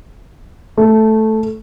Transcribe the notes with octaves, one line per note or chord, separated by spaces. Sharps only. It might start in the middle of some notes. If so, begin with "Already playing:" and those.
A3